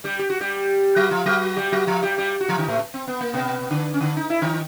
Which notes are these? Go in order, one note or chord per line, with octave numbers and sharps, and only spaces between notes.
G3 G4
G4
F#4
G3 G4
F#3 F#4
F3 F4
F#3 F#4
G3 G4
F#3 F#4
F3 F4
G3 G4
G3 G4
F#4
F3 F4
D#3 D#4
A2 A3
C4
B3
A#3
B2 B3
D3 D4
C#4
D3 D4
D#4
E4
D#3 D#4